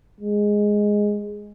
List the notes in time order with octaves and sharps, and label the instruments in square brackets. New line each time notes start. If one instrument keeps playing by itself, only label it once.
[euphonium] G#3